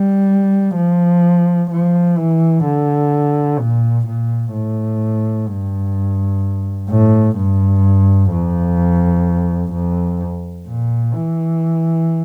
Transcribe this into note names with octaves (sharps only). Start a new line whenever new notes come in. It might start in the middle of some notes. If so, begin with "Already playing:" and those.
Already playing: G3
F3
F3
E3
D3
A#2
A#2
A2
G2
A2
G2
F2
F2
A#2
E3